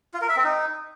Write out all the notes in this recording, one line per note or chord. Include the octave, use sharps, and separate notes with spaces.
F4
A#4
E5
C4
D#4